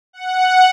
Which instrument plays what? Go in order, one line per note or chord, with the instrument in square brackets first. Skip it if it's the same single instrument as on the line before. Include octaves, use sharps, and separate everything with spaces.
[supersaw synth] F#5